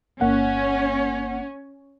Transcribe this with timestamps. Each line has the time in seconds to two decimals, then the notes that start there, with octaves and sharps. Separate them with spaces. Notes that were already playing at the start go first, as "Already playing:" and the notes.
0.21 G1 A#3 C#4 C#5 F#5